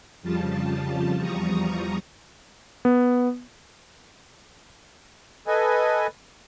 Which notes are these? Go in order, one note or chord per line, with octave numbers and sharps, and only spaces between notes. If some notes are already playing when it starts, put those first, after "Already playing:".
F2 C#3 F3 G3 F4 A5
E2 F3 G3 A#5 C#6 D#6
B3
A4 B4 D#5 G#5